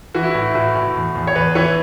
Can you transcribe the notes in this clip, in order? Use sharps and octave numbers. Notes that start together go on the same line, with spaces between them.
E3 F#4
E4
A2 F#4
A2 F#4
A2
E2
E2
C#5
E2 B4
E3 C#5